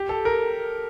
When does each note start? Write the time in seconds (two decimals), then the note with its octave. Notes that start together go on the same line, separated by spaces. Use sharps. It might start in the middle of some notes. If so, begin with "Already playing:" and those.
Already playing: G4
0.09 A4
0.25 A#4